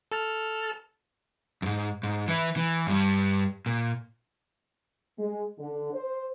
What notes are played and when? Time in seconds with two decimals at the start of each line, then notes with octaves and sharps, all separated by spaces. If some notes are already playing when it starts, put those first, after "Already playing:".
0.12 A4 A5 F6
1.62 F2 G#2
2.03 G#2
2.28 E3 E4
2.57 E3
2.87 G2 G3
3.66 A#2
5.18 G#3
5.58 D3
5.94 C5